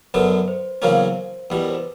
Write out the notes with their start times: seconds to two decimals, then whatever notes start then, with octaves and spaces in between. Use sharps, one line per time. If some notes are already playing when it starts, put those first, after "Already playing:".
0.14 F#2 D3 F#3 B3 B4
0.48 C5
0.82 E2 C#3 F#3 A#3 C#4 C5
1.50 E2 B2 G3 B4
1.62 A#4
1.69 C5
1.74 B4